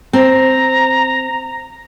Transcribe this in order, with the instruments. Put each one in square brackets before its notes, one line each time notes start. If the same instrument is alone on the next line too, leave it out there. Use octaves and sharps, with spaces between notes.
[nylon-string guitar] C4 [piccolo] A#5